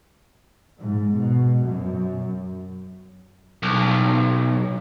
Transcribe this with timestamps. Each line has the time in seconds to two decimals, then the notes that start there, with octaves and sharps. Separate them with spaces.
0.81 G#2
1.19 B2
1.69 F#2
3.63 B1